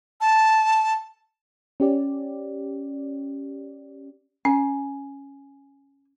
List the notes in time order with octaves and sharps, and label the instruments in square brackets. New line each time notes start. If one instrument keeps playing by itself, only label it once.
[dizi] A5
[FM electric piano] C#4 G4 D5
[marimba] C#4 [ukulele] G#5